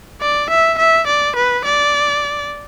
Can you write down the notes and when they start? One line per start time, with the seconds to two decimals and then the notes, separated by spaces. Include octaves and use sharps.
0.21 D5
0.50 E5
0.78 E5
1.07 D5
1.36 B4
1.65 D5